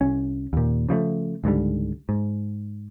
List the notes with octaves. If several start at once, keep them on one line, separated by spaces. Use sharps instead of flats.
C2 C#4
D#2 A#2
C#3 F3 G3 A3
C#2 G#2 D3 G3
G#2